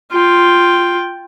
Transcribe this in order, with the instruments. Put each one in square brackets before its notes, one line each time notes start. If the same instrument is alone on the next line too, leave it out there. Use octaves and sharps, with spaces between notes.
[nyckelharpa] F4 G5